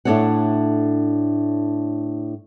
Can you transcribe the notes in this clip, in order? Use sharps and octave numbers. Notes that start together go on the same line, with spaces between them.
A2 D4 A4 C#5 F#5